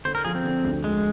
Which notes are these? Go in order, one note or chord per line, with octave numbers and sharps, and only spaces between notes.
D3 C5
A#4
F3 G#4
C4
D3
D2
F3 G#3